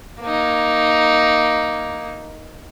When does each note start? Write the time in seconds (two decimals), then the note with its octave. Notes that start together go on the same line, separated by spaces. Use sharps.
0.22 A#3 D#4